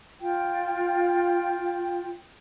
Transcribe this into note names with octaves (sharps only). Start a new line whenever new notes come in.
F4 G5